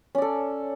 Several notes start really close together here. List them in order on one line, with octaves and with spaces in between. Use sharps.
C#4 D5 A4